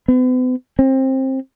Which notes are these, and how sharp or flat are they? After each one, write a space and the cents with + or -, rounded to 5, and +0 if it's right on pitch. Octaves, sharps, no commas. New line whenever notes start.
B3 +45
C4 +20